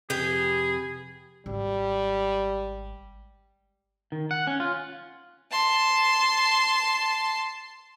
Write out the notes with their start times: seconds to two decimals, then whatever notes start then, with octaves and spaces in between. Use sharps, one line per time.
0.10 F2 G#2 C3 G4 G#4 B4 G5
1.46 G#1 G3
4.12 D#3
4.31 F#5
4.47 C#4
4.60 F4
5.51 A5 C6